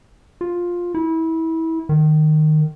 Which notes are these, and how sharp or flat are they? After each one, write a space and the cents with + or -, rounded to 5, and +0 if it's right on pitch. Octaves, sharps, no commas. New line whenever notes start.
F4 +10
E4 -25
D#3 -15